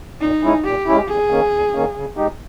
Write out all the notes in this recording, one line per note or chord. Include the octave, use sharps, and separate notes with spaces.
A#2 D#4
G#3 C#4 E4
A#2 G4
G#3 C#4 E4
E2 G#4
D#3 A#3 C#4
E2
D#3 A#3 C#4
C#3
G#3 D#4 G4